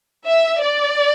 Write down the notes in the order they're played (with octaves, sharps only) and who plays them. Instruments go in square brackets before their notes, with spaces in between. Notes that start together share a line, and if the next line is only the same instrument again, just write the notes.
[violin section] E5
D5